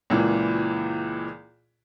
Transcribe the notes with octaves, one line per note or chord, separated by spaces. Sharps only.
C#2 A#2 E3